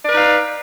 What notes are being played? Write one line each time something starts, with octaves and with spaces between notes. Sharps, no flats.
D#4 B4 D5 F5